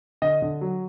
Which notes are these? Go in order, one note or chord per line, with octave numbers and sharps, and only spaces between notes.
D3 D#5
D3
F#3